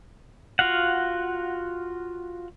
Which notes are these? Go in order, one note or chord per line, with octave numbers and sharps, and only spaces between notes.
F4 F#4 F5 F#5